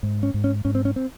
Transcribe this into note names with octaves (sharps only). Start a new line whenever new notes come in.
G#2
C#4
G#2
C#4
G#2 C#4
C4
C#4
C4